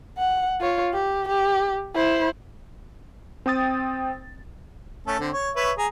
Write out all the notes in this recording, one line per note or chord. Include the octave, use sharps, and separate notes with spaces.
F#5
F4 C#5
G4
G4
E4 C5
C4 G5 D#6 A6
A3 C#4 A4
D3 C4
C#5
B4 C#5 E5
G#4 A#5